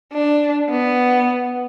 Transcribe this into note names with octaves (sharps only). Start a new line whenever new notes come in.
D4
B3